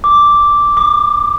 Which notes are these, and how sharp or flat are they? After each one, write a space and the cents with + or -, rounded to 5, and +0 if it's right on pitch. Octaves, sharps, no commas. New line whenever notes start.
D6 -5
D6 +40